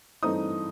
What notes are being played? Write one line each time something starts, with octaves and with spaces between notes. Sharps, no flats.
G2 E3 A3 C4 D#4 D#6